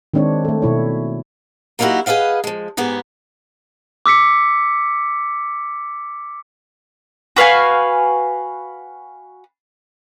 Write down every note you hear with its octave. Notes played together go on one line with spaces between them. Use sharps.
D#3 G#3 C4 D4 C#5
A3 A4
B2 E4 C#5
F#3 A#3 D#4 E4 F#4 G4
G#4 B4 D#5 F5 F#5
F3 G#3
G#2 B3 G4 G#4
D6 E6 B6 C#7
F#4 B4 F5 G#5